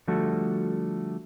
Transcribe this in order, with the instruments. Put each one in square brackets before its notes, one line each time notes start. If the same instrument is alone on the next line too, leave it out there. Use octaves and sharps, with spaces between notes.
[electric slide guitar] D3 F3 G3 A3 F#4 A4